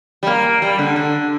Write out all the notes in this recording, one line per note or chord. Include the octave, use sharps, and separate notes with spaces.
G3
A#3
G3
D3
D3